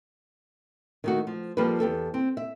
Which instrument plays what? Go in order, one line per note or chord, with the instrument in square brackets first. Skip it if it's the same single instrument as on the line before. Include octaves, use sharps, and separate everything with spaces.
[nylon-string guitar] D#3 A3 F#4
F3
F3 G3 A#3 A4 B4
E2 G4 A4
C4
E5